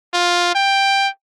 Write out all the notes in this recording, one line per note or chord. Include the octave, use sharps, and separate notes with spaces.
F4
G5